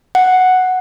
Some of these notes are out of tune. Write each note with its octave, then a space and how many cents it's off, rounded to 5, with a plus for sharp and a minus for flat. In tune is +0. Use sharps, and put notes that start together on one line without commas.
F#5 +0